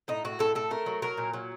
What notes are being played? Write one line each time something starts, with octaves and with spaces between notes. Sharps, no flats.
A2 D#4
A2 F#4
A2 A4
A2 A4
A3 A#4
F#3
F#3 A#4
A#2
F#3